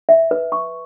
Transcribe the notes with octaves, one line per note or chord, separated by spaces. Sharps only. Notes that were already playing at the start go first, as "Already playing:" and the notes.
E5
B4
C#6